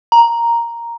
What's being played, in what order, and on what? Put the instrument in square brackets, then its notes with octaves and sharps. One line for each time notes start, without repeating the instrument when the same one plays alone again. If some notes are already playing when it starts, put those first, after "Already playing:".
[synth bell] A#5